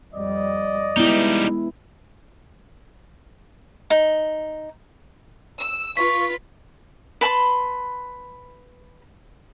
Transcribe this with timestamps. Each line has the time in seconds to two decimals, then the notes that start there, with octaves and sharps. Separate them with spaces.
0.14 F2 G3 D5 D#5
0.97 G3 G#3 B3 D#4 E4
3.90 D#4
5.59 E6
5.97 F4 B4 C#6 B6
7.21 B4 A5 B5 C6